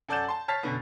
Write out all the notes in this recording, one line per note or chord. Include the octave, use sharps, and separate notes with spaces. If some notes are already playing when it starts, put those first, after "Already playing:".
F#2 A4 D5 F#5 G6 E7
A5 C6
C#5 A5 F6 A6 B6 C7
F#2 B2 D3 B3